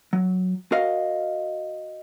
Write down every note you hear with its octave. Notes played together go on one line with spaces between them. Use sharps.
F#3
F#4 A#4 D#5 F5